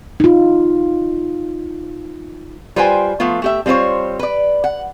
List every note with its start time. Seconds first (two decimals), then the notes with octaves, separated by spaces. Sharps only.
0.20 D#4 F4
2.76 G3 F4 B4 C5 G5 G#5
3.20 F3 A3 B3 F4
3.42 A3 G4 E5
3.66 G3 C4 F4 C5 C#5
4.19 B4 D5
4.64 F#5